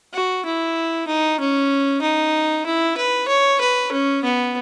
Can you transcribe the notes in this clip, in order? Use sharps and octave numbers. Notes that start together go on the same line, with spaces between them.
F#4
E4
D#4
C#4
D#4
E4
B4
C#5
B4
C#4
B3